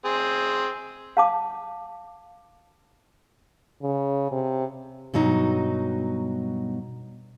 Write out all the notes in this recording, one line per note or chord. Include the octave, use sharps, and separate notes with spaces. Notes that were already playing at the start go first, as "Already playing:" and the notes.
C4 G#4
F5 A5 D6
C#3
C3
G2 B2 F#3 D#4